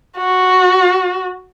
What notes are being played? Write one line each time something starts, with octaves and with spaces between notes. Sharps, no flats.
F#4